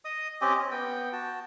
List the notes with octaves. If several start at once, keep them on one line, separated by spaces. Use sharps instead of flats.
D#5 D#6
C4 C#4 G4 D#5
C#4
B3 G5
F#4 A5